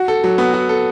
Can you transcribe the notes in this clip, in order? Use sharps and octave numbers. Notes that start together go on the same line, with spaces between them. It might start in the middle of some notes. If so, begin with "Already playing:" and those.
Already playing: F#4
A4
F#3
B3
F#4
A4